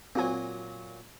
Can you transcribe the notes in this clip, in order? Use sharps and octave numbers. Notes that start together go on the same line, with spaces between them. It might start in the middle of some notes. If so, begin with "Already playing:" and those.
A#2 F#3 C4 F#4 G#5